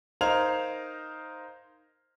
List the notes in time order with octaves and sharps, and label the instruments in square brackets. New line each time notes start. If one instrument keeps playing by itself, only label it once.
[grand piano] D#4 A#4 C5 F5 G#6 F7